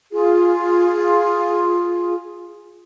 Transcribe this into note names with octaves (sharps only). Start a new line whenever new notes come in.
F4 G#4